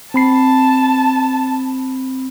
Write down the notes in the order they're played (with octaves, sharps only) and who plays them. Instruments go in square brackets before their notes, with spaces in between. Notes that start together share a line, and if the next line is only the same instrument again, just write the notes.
[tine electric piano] C4 B5 C7 [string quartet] A5